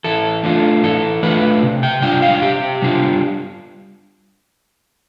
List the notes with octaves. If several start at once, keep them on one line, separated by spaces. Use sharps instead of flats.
E3 A4
A3 D4 F4
E3 A4
A3 D4 F4 B4
C3
G5
G3 D4 F4 G5
F5
C3 G4
G3 D4 F4